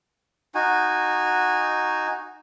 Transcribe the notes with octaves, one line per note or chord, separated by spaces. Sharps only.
D#4 F#4 G#5